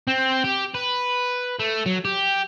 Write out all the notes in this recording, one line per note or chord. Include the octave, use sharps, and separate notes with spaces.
C4
G4
B4
A3
F#3
G4